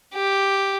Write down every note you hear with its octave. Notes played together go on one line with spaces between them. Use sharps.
G4